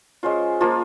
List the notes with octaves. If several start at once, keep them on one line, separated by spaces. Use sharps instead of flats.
G#3 C#4 F4 C5
F3 A#3 F4